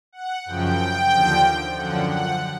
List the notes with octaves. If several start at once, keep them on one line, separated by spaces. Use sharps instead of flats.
F#5
F#2 C#3 F3 G5
D#2 D3 F3
F#2 D3 F3 F#5
F#5